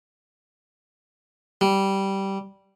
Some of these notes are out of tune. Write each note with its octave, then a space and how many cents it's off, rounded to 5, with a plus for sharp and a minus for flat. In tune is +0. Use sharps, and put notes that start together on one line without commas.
G3 -10